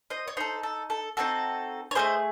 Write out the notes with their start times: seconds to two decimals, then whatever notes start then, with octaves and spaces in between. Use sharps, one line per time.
0.10 C5 D#5
0.28 C#5
0.37 D#4 A4 C5
0.63 A4
0.90 A4
1.17 C4 D#4 F#4 A4
1.91 C#5
1.95 A3 C#4 G#4 C5 D#5